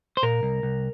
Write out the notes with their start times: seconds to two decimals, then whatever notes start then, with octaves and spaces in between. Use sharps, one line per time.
0.17 C5
0.23 A#2 A#4
0.43 C2
0.63 C2